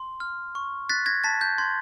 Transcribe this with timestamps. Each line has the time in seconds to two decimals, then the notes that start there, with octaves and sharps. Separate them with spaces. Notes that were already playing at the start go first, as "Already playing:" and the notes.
Already playing: C6
0.20 F6
0.55 C#6
0.89 F#6 A6 B6
1.06 G#6 A#6
1.24 A5 A6 B6
1.41 G6
1.58 C6 G#6